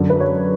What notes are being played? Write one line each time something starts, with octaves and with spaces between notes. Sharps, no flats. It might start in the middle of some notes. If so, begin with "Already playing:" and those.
Already playing: F#2 D3
B4
C#5